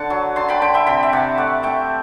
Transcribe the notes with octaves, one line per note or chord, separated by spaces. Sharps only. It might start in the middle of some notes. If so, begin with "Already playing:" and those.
Already playing: D3 F#5 A5
F#3
D3 A5 C6
G5 B5
D3 G5 B5
E5 G5
C3 G5 B5
E5
C3 D5 F#5
A3 D5 F#5
A3 E5 G5